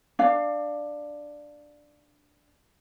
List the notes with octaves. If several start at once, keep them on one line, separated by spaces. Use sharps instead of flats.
D4 F5